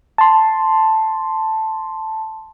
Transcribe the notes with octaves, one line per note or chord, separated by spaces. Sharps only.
A5 C6